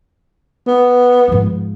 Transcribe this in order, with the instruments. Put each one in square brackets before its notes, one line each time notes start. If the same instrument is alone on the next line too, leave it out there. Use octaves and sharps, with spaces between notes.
[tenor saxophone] B3
[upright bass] G#2 F3